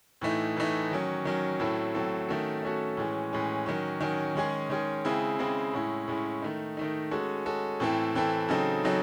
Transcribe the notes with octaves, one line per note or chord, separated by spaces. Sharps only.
A2 E3 A3 D#4
A2 E3 A3 D#4
D#3 F#3 C#4
D#3 F#3 C#4
A2 F#3 C4 E4 A4
A2 F#3 C4 E4 A4
D#3 A3 C#4 F#4 A4
D#3 A3 C#4 F#4 A4
A2 E3 G#3 C#4
A2 E3 G#3 C#4
D#3 F#3 C#4
D#3 F#3 C#4
D#3 G#3 C#4 G#4
D#3 G#3 C#4 G#4
C#3 G#3 C4 E4 G#4
C#3 G#3 C4 E4 G#4
A2 G#3 C#4 E4
A2 G#3 C#4 E4
D#3 A3 D#4
D#3 A3 D#4
G#3 C#4 F#4 A4
G#3 C#4 F#4 A4
A2 E3 C4 E4 A4
A2 E3 C4 E4 A4
C#3 F#3 C4 D#4 A4
C#3 F#3 C4 D#4 A4